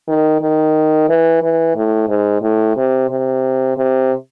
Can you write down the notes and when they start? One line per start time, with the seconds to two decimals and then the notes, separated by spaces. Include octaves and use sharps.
0.08 D#3
0.41 D#3
1.09 E3
1.42 E3
1.76 A2
2.09 G#2
2.42 A2
2.76 C3
3.10 C3
3.77 C3